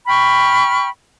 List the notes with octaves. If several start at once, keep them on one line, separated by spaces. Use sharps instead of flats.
G5 B5 C#6 F6